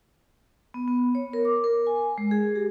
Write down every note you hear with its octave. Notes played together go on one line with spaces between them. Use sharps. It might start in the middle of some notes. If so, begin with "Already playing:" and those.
B3
B3
C#5
A#4
D6
A#4
G#5
G#3
G#4
G4